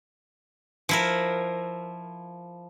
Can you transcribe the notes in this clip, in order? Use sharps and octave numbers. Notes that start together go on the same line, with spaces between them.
F3 E4 A#4